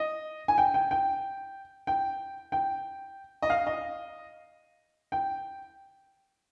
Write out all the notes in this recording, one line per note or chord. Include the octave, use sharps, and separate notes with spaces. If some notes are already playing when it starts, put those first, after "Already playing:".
Already playing: D#5
G#5
G5
G5
G5
G5
G5
D#5
F5
D#5
G5